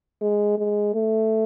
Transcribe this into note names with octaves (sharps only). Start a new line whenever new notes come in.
G#3
G#3
A3